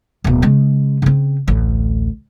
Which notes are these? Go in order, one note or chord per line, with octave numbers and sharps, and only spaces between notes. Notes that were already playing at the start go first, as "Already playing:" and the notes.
D1 B2
C#3 G#3
C#3 C4
A1 D2